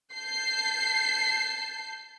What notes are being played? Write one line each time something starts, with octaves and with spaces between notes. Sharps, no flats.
A5 G6 C7